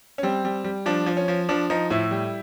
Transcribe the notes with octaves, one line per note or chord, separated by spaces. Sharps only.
C#4
G3 C4
G3
G3
F3 D4
F3
C#4
F3
F3 D4
F3 D#4
A2 E4
G3